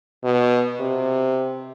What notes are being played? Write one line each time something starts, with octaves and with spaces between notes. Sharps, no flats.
B2
C3